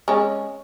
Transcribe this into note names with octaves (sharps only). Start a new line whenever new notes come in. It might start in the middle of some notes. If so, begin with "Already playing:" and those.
G#3 C#4